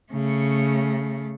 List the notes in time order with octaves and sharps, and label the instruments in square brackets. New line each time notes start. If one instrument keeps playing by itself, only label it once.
[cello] C#3 A3